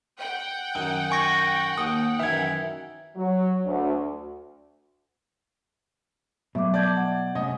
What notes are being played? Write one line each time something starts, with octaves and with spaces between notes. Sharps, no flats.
F#5 G5
F#2 D#3 D#5
G#5 C#6 A#6
D#2 D#6
F#2 D#3 E3 E5 G#6
F#3
D2
B2 F#3 A3 E5 G5 D6
D5 A5 G6 G#6
F#5
C3 A3 C#4 D#5